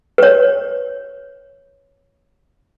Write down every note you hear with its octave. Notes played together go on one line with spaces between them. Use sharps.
B4 C#5